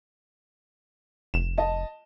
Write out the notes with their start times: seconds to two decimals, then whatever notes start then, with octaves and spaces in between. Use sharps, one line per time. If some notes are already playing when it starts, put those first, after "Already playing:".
1.34 F1 E7
1.58 D#5 A5